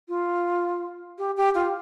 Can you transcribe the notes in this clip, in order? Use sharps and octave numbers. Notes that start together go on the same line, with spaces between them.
F4
G4
G4
F4